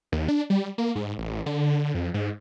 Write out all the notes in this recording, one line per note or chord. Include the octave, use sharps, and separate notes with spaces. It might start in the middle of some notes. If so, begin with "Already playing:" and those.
D#2
D4
G3
A#3
G#2
A1
D3
F2
G#2